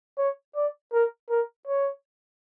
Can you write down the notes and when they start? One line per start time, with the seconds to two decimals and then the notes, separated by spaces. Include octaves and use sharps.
0.18 C#5
0.56 D5
0.93 A#4
1.30 A#4
1.67 C#5